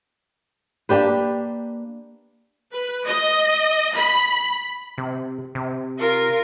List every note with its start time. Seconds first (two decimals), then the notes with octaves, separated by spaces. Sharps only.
0.89 A#3 D4 G4 B4
2.73 B4
3.06 D#5
3.96 B5
4.98 C3
5.55 C3
5.99 F4 A#4